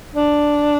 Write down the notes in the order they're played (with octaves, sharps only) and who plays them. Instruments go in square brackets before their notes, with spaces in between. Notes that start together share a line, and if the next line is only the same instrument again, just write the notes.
[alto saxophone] D4